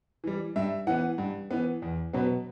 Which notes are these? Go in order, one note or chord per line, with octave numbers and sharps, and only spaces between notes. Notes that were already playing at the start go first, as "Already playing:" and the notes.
E3 G3
G2 E5
E3 B3 F#5
G2
E3 B3
E2
B2 F#3 B3